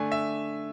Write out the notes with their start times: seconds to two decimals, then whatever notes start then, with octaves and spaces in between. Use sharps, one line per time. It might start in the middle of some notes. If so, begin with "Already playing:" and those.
Already playing: D3 A3 D4 G#5
0.12 E5